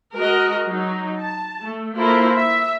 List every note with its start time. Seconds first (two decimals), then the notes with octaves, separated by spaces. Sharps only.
0.15 G#3 F#4 A#4 D#5
0.66 F#3 D#4
1.20 A5
1.60 A3
1.97 A#3 E4 F4 A4 A#4 C5
2.36 E5